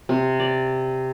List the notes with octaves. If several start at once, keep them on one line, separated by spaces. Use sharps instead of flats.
C3
D5